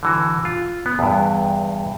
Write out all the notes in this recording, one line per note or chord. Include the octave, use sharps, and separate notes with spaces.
D3 E3 F#4
F4
B3
E2 G2